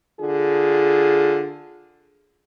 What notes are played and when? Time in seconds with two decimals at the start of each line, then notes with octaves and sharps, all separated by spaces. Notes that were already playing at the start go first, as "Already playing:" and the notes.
0.19 D3 F4 G#4